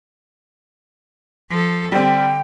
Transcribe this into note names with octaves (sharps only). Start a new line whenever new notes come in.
F3 A4
D3 G3 C4 G5